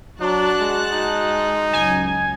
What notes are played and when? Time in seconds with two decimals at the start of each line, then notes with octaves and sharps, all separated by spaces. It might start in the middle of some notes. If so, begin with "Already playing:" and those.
0.21 F#3 D4 F#4 A5 F#6
0.61 G#3
0.93 D#4
1.73 C#2 F#2 G#5